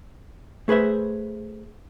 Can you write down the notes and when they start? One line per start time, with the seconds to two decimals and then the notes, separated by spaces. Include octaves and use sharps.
0.68 A3 G#4 B4 C5 E5